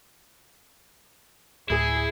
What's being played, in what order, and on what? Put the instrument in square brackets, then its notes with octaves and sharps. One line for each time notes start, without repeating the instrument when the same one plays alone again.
[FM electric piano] D2 A2 [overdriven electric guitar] E4 [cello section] G#4